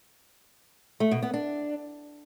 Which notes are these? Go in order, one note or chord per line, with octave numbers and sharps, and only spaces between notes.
A3
B2
B3
D4